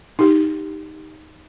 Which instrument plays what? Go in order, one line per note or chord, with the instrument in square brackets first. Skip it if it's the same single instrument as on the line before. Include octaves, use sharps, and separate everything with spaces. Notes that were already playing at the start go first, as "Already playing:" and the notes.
[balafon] D#4 G4